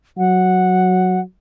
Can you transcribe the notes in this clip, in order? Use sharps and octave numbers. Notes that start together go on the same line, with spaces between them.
F#3 F#5